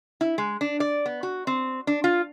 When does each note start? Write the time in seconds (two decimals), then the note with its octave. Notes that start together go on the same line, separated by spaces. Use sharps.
0.21 E4
0.38 G#3
0.61 D4
0.80 D5
1.06 B3
1.23 F#4
1.47 C4
1.87 D4
2.04 F4